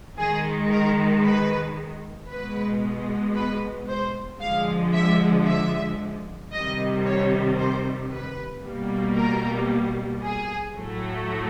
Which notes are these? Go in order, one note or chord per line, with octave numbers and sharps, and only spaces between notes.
D#3 G#3 G#4
A#4
B4
B2 G#3 B4
B4
C5
D3 F3 G#3 F5
E5
E5
C3 D#3 G3 D#5
C#5
C5
B4
B2 G3 A#3
A#4
G#4
A2 F#3 A3